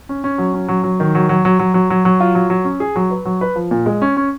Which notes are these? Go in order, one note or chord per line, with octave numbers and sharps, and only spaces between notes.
C#4
C#4
F#3
C#4
F#3
F#3
D#3
F#3
F#3
F#3
F#3
F#3
F#3
F#3
F4
F#3
F#3
C#4
G#4
F#3
B4
F#3
B4
F3
A#2
G#3
C#4
C#4